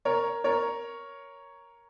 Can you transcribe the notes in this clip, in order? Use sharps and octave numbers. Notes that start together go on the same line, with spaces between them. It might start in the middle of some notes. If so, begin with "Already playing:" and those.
A#4 C#5
A#4 C#5